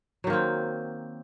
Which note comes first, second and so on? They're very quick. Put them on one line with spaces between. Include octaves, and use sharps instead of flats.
F#3 D#3 A#3 C4